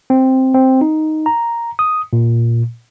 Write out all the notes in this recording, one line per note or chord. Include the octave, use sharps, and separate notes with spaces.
C4
C4
D#4
A#5
D#6
A#2